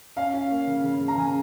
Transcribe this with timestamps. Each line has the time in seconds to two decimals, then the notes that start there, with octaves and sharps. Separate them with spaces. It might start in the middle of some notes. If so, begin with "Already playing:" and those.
0.16 C#4 F5
0.34 C#4
0.50 A#3
0.67 C#3
0.84 C#3
1.01 C#3
1.08 A#5
1.17 C#3 G#5